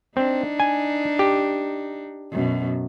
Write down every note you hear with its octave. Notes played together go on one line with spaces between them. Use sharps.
C4 D4 D#4
G#5
G4
F#2 B2